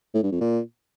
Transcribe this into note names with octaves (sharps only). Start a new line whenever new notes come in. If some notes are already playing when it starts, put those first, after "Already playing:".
A2
G2
F2
A#2